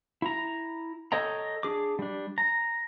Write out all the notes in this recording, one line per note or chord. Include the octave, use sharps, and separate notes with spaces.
E4 A#5
A4 C#5 D#5 G5 A#5
D4 G#4 D6
G3 D4
A#5